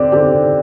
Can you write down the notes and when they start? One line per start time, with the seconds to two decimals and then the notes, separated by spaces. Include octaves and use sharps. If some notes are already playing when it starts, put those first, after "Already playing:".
Already playing: D3 C4 G4 D5
0.12 D3 C4 G4